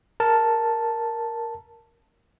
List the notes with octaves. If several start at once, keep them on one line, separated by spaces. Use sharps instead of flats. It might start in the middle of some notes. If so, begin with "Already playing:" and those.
A#4 A5